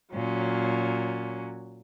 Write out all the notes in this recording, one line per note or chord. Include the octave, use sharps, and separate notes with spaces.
A#2 F#3 C#4